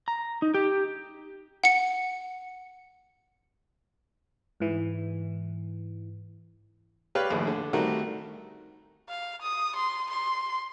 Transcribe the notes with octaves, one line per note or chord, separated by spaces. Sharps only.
A#5
D#4
G4
F#5 C#7
G#2 E3
G4 B4 C#5 D5 F5
A#1 D#2 A2
D3
D#3 G3 A3 C4 F#4 A#4
F5
D#6
C6
C6